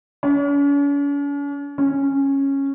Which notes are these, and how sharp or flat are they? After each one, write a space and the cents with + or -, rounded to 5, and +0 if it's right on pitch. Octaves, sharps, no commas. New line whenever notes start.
C#4 +45
C#4 -10